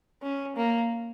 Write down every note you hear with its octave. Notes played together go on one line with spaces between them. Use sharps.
C#4
A#3